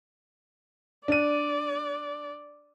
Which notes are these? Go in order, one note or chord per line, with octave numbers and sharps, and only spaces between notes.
D4 D5 D#7